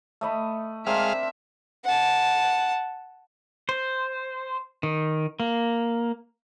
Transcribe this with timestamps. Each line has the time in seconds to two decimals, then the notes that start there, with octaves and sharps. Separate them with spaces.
0.21 A3 D#5 B5
0.86 G#3 C4 D4 A#4 E5 F5
1.84 F#5 A5
3.69 C5
4.83 D#3
5.40 A#3